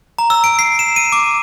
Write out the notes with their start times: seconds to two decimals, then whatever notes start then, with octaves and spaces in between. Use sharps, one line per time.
0.19 A#5
0.30 E6
0.44 D7
0.59 C7
0.79 E7
0.96 D#7
1.12 D6